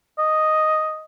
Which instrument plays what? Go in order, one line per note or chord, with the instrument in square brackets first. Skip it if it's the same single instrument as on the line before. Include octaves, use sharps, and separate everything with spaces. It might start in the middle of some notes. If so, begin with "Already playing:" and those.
[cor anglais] D#5